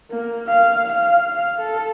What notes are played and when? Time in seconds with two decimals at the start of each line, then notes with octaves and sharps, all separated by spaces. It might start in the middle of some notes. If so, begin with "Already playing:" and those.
0.10 A#3
0.47 F5
0.88 F5
1.30 F5
1.59 A4